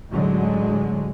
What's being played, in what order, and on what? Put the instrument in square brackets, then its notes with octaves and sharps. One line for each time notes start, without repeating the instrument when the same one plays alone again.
[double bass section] A1 D3 F#3 G#3